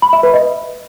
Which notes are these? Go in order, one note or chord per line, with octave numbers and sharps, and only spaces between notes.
B5
E5
B4
D#5